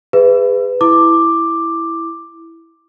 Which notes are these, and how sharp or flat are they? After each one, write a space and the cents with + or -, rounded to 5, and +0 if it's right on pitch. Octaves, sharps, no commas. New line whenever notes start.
G#4 -25 B4 +15 E5 +25
E4 +0 D6 +5